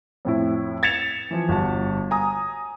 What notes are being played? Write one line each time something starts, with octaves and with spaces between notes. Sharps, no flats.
F2 A2 E4
G#6 A6 B6 C#7 E7 F7
E3 F3
G1 F#4 A5
G#5 A#5 D#6